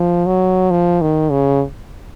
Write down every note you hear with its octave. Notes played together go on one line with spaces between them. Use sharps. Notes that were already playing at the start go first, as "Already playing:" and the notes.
Already playing: F3
F#3
F3
D#3
C#3